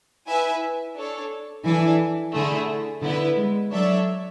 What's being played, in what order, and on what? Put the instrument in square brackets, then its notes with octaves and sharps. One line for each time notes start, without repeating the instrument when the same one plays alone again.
[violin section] E4 B4 E5 G#5
D4 A4 C#5
[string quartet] E3 [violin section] D4 A4 E5 G#5
[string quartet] D3 [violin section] A3 E4 G#4
[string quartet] D3 [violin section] B3 E4 B4
[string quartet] G#3
[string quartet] F#3 [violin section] D4 A4 C#5 E5